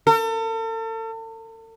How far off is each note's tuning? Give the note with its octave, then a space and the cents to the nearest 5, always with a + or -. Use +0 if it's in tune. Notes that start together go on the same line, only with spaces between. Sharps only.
A4 +40